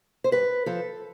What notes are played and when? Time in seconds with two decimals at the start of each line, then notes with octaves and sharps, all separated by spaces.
0.24 C5
0.31 G2 B4
0.66 F3 A4